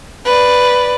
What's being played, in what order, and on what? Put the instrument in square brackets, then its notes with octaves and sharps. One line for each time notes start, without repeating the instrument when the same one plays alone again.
[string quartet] B4 D5